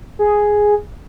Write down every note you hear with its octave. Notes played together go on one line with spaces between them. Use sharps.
G#4